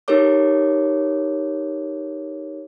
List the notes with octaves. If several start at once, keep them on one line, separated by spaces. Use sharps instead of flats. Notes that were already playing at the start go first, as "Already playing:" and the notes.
D#4 G4 A4 A#4 C#5 D6